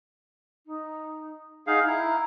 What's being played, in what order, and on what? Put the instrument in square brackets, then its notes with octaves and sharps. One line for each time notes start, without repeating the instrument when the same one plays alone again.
[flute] D#4
[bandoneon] D#4 G#4 F5 [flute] F#5
[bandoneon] E4 [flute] A#5